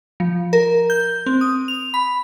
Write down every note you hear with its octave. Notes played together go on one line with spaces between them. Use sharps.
F3
A#4
G6
C4
D#6
F7
B5